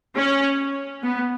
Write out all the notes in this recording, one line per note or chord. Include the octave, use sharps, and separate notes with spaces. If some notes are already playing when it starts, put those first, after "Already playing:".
C#4
B3